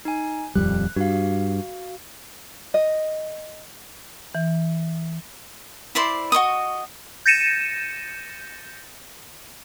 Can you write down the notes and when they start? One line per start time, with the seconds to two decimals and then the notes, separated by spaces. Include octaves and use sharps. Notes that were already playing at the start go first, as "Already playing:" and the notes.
0.05 D#4 G#5
0.55 D#1 F2 G3 F#6
0.96 G2 F#4 F5
2.74 D#5
4.35 E3
5.95 E4 C5 D5 C6
6.32 F#4 D#5 C#6 D#6
7.26 G6 A6 A#6 C#7 D#7 E7